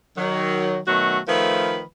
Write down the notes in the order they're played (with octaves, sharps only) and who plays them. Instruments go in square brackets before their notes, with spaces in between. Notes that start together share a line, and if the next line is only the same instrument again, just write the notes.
[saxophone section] D#3 F#3
B2 D#3 F#3 A3 F#4
D#3 F3 A3 B4